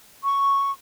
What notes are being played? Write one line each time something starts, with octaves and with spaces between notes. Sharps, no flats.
C#6